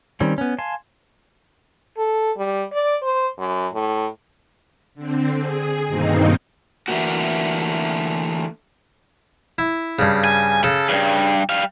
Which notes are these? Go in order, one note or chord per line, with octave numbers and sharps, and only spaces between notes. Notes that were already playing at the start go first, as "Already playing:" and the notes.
D#3 G3 C4 C#4
B3 C#4
F5 G#5 A5 C6
A4
G3
D5
C5
F#2
A2
D3 C4
G#4
G2 B2 D#3 A#3 C4 D#4
D3 E3 A3 A#3 F#4
E4
G2 C#3
G#5
C#3 A4
E2 G2
G3 F5